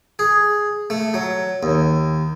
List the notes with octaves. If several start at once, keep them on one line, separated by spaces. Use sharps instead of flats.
G#4
A3
F#3
D#2